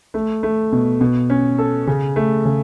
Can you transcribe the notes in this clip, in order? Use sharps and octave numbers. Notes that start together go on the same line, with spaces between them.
A3
A3
B2
B2
C#4
A4
C#3
A3
C#3